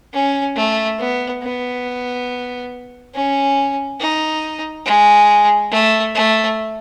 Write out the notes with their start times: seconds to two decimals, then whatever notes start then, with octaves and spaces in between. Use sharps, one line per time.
0.13 C#4
0.56 A3
0.99 B3
1.42 B3
3.14 C#4
4.00 D#4
4.86 G#3
5.72 A3
6.15 A3